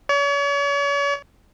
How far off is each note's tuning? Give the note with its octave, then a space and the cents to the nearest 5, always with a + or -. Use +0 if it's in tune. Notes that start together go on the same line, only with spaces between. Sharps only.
C#5 +40